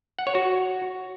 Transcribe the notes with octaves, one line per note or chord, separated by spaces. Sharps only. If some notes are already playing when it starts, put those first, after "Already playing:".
F#5
C#5
F#4